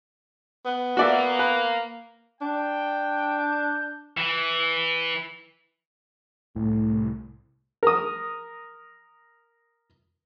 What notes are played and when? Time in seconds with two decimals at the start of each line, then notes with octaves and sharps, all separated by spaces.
0.65 B3
0.97 A#3 F#4 D5 E5
1.39 B4
2.41 D4 G5
3.39 G6
4.17 E3
6.56 C2 A2
7.83 A#4 D#6